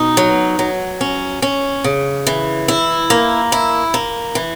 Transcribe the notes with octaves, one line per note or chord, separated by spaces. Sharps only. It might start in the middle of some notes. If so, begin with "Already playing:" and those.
Already playing: B2 D#4
F#3
F#3
C#4
C#4
C#3
E3
E4
A#3
E4
A#3
E3